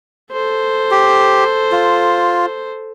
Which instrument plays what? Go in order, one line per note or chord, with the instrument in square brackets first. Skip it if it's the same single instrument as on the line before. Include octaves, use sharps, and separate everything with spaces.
[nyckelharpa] A4 C5
[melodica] G4
F4